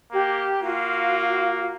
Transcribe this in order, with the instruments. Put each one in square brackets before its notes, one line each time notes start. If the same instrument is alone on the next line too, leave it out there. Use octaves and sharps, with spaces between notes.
[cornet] A#3 [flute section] G4
[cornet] A#3 [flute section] F4 F#4 F5